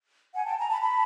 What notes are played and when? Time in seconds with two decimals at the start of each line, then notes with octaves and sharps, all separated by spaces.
0.34 F#5 G#5
0.46 G5 A5
0.57 G#5 A#5
0.69 A5 B5
0.81 A5 B5